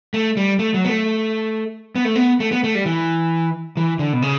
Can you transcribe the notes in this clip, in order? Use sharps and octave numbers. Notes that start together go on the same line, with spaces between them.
A3
G3
A3
F#3
B3
A3
B3
A3
B3
A3
B3
A3
G3
E3
E3
D3
B2
C#3